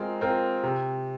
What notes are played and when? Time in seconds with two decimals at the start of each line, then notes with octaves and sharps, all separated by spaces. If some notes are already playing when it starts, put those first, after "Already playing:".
Already playing: G#3 C4 F4 A#4
0.21 C4 F4 A#4
0.63 C3